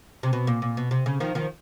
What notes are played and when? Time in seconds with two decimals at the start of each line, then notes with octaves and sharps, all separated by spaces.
0.23 C3
0.33 B2
0.47 A#2
0.62 A#2
0.77 B2
0.91 C3
1.06 C#3
1.20 D#3 F3
1.35 D#3 F3